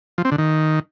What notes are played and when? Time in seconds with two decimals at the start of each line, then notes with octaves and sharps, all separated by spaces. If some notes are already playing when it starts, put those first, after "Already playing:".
0.18 F3
0.25 C4
0.32 D3
0.38 D#3